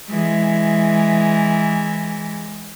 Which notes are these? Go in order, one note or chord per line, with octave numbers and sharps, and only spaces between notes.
E3 G#3